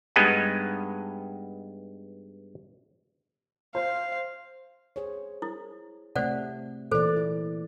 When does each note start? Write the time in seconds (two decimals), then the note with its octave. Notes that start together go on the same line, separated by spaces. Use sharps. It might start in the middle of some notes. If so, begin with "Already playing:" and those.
0.16 G2 G#3 B3 D#4 D#5 G#5
3.75 C5 F5
4.96 G#4 C5 C#5
5.42 E4
6.16 C3 A3 C5 D5 F#5
6.92 A#2 E3 A4 C5 D5
7.16 E4